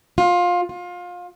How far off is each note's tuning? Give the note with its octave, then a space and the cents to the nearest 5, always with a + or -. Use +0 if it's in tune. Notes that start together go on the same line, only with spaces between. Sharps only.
F4 +20
F4 +25